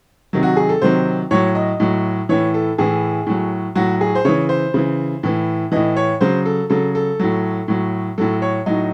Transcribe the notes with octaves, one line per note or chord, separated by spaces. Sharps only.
C3 D#3 F#3
F#4
G#4
A4
C3 D#3 F#3 C5
A2 F#3 C#5
D#5
A2 F#3
A2 E3 C#5
A4
A2 E3 G#4
A2 F#3
A2 F#3 F#4
G#4
C5
C#3 E3 C#5
C5
C#3 E3
A2 E3
A2 E3 D#5
C#5
C#3 F#3 C5
A4
C#3 F#3 A4
A4
A2 F#3
A2 F#3
A2 F#3 A4
C#5
A2 F#3 D#4